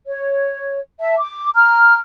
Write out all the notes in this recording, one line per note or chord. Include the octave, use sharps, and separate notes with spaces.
C#5
E5 A5
D6
A#5 F6